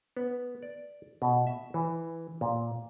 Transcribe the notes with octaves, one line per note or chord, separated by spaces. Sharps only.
B3
D5
B2
E5
E3
A#2